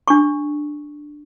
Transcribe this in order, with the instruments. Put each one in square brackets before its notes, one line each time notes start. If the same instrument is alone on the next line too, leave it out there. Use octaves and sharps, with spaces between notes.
[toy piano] D4 C#6